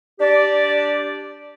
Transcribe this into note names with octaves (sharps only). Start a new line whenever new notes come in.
D4 G4 D5